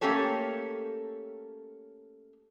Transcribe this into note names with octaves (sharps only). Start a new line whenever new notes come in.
A3 A#3 C#4 G4 A4 C#5